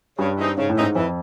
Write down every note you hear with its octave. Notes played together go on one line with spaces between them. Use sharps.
G2 C#3
E3 G#3 C4 D#4
G#2 C#3
A2
G#2 E3 G#3 C4 D#4
F2 E3